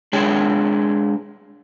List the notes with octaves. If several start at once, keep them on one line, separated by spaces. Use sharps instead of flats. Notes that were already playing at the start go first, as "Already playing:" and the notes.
G#3 D4 G#4 C#5 G5